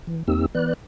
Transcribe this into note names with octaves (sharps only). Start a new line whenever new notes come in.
E3
E2 A#3 C4 D#4 G4 E6
E3 B3 B4 D5 F#6